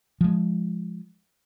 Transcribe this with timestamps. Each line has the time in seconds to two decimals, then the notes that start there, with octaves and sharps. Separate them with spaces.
0.21 F3 G#3